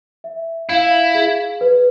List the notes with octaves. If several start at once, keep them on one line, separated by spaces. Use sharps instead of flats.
E5
E4 F5
G#4
B4